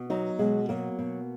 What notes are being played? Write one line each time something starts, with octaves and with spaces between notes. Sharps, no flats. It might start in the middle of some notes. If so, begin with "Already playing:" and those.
Already playing: B2
F#3 D#4
B2 G#3
F#3 A#3
B2